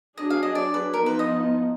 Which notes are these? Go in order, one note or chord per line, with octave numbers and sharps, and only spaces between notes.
F#3 D4 G#4 D#5
F5
D#5
D5
B4
F3 B3 D#4 A#4
B4
D#5